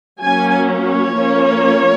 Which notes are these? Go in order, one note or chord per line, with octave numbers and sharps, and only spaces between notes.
F#3 A#3 C#4 G#5
C#5
F3 A#3 C#4